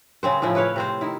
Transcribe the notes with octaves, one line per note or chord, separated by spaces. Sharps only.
C#3 C4 C5
A2 C#3 F3 E4
E4 B4 C#5 F5
C3 C4 C5
D#3 E4